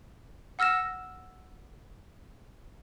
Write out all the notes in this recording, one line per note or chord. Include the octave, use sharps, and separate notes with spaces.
F#5 E6 F6 A#6 E7